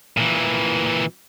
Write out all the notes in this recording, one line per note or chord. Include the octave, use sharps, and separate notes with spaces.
A#2 E3